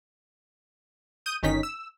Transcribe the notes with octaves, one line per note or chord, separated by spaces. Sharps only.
D#6 G6 D#7
G1 D#3 C#4 D#4 B6
E6